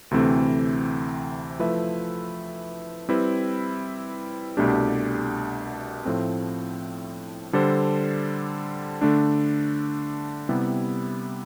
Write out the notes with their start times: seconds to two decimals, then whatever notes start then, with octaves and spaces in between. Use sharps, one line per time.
0.11 D2 C3 E3 A3 C4
1.59 F3 A3 E4 B4 E5
3.09 G3 C4 E4 B4
4.57 C2 B2 A3 D4 G4
6.05 A2 F3 A3 C4
7.53 D3 G3 D4 A4 C5
9.01 D3 A3 D4
10.49 C3 G3 B3 E4